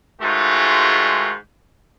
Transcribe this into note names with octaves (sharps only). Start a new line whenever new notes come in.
G#2 D#3 G#3 A3 F4 F#4